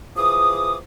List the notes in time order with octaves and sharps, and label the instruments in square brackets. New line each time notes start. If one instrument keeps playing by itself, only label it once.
[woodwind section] E3 F3 G#4 D6 D#6